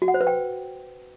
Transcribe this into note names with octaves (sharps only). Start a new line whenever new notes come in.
F#4
F#5
C5
B4
G5